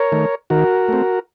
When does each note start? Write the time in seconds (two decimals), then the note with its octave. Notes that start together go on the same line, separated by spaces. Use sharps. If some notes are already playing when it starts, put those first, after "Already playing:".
Already playing: A#4 C#5
0.12 D#3 A3
0.50 D#3 F#4 A#4
0.88 A3 C4